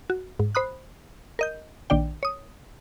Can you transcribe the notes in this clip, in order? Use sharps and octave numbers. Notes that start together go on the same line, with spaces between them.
F#4
G#2
C5 B5 D#6 F#6
A#4 D#5 G6
A#1 D#3 D4 D5 G5
C#5 D#6